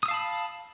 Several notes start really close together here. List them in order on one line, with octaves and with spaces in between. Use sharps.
D#6 E6 F5 A5 B5